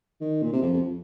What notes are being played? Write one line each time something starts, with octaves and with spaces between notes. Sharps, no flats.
D#3
A#2
C3
F2
F2